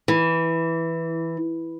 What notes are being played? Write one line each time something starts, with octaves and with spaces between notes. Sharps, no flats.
E3